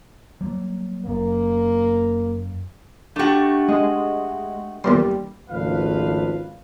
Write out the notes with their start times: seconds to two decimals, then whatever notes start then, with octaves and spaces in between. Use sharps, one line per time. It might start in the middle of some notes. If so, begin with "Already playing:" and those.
0.41 F#3 G3 A#3
1.05 F#1 F#2 A#3
3.16 A3 D4 F#4 G4
3.68 G#3 D#5
4.84 E2 A#2 G3 C6
5.49 G#1 C#2 F3 A3 B4 F5